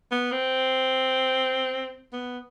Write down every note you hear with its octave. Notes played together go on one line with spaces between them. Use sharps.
B3
C4
B3